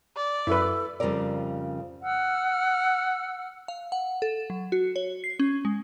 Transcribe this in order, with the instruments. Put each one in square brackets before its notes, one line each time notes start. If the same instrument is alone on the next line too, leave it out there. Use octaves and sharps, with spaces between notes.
[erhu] D5
[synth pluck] F#2 [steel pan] E4 B4 [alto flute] A4
[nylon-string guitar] F2 C#3 G3 F4 A#4 D5
[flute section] F#5 E6 F6
[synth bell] F5
F#5
A4
F#3
F#4
C#5
C7
C#4
G#3